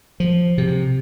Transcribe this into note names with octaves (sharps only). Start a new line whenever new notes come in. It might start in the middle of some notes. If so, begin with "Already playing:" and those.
F3
C3